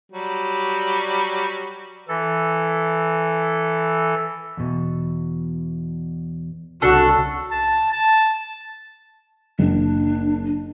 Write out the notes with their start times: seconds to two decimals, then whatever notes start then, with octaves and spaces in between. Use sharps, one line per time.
0.12 F#3 G3
2.08 E3 A4
4.57 E2 B2
6.82 C2 C#3 D4 F#4 A4
7.51 A5
7.92 A5
9.59 F#1 D4